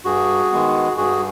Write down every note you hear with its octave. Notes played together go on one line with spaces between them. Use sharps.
G2 F#4 G#4
D#3 G#3 B3
G2 F#4 G#4